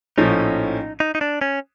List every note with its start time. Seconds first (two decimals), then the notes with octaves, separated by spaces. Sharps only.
0.18 A#1 A2 F3 A3 C#4 D#4
1.00 D#4
1.15 D#4
1.21 D4
1.41 C#4